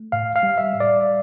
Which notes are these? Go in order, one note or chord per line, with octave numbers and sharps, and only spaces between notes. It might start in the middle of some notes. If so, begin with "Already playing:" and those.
Already playing: A3
A2 F5
F5
G3
E5
G3
D5